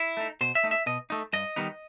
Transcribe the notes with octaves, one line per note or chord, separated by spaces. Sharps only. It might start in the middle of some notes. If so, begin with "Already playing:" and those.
Already playing: E4
A3 D#4
B2 C5
E5
A3 D#4
E5
B2 D#5
A3 D#4
G2 D#5
D#3 G3 B3 D#4